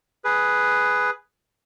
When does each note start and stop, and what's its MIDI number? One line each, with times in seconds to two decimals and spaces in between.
0.24 1.11 68
0.24 1.11 71